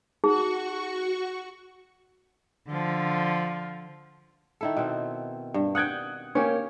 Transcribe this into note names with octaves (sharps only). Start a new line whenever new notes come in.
D#4 F#4 G#4 C#6
D3 F3
D#3 E4 A4
B2 C4
G2
F#5 G5 D#6 F#6 G#6
A#3 C#4 G4 C#5